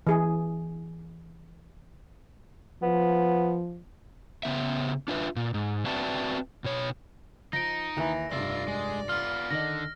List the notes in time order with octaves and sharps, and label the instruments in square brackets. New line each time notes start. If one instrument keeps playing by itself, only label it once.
[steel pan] E3 G#4
[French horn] F3 [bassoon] B3
[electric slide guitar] C#3 B3 E5
D4 F4 B4 E5
A#2
G#2
C4 F#4 B4 D5 E5 A5
B2 C#5
[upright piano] F3 [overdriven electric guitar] D#4 [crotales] A#6 D7
[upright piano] D#2 [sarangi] E3
[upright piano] F1 G2 [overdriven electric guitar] F4 E5 [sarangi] D5
[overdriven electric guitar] G#3
[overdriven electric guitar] B3 F4 [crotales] F6
[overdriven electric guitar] D3 [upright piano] D#3 D#5 [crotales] A#6